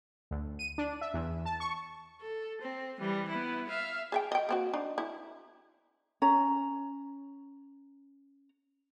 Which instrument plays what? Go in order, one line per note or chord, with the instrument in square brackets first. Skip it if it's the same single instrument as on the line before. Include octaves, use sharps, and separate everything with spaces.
[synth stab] D2
D#7
D4
E5
E2
A5
C#6
[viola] A4
C4
E3 G3
B3 E4
E5 F5
[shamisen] G#4 E5 G5
D#5 G5
A#3 C4 F#4
D4 D#4
E4
[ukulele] C#4 A#5